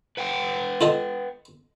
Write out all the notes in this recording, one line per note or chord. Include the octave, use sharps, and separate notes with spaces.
B4 F#5 G5
F4 A4 D#5